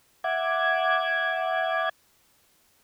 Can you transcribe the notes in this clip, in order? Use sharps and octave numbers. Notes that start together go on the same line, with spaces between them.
E5 F#5 D6 G#6